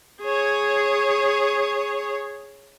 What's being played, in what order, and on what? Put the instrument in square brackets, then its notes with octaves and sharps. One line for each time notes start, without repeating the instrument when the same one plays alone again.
[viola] G#4 C#5